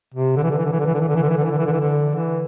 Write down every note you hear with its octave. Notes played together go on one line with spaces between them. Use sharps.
C3
D3
E3
D3
E3
D3
E3
D3
E3
D3
E3
D3
E3
D3
E3
D3
E3
D3
E3
D3
E3
D3
E3